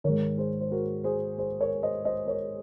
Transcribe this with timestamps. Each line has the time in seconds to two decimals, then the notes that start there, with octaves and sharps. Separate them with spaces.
0.04 G#2 D#3 A#4 C#5
0.38 G#4 C5
0.61 C5
0.71 F#4 A#4
1.04 G#4 C5
1.38 G#4 C5
1.60 A#4 C#5
1.83 C5 D#5
2.05 C5 D#5
2.27 A#4 C#5